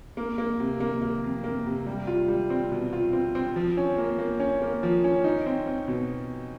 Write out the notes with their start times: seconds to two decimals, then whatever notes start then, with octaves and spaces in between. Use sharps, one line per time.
0.17 A#3
0.38 A#3
0.60 C3
0.80 A#3
1.02 A#3
1.24 F2
1.44 A#3
1.66 C3
1.86 G3
2.07 F4
2.28 G3
2.50 C4
2.72 B2
2.93 F4
3.13 C4
3.35 C4
3.56 F3
3.77 C#4
3.98 A#3
4.18 A#3
4.40 C#4
4.62 A#3
4.83 F3
5.04 C#4
5.24 D#4
5.46 C4
5.67 C4
5.88 B2